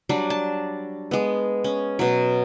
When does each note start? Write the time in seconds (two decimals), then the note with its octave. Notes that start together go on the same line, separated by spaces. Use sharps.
0.09 F#3 G3 D4
0.30 A5
1.11 G#3 B3
1.64 C#4
1.99 B2 F#3